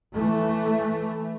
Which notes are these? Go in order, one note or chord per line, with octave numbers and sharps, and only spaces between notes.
E3 A3